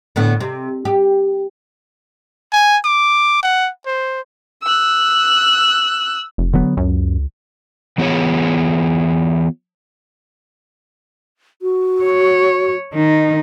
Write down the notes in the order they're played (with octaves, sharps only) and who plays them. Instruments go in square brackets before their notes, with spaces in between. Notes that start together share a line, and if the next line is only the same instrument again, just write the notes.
[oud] A2 D3 B3
C3
G4
[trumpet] G#5
D6
F#5
C5
[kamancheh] E6 F#6
[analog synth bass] F1
[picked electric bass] D3 F#3 B3
[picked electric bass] C#2 [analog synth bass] F#2
[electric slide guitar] E3 B3 F4 G#4 C#5
[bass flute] F#4
[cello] C#5
D#3 D#4